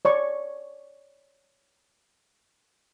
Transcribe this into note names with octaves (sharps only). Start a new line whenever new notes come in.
C#5 D5 C#6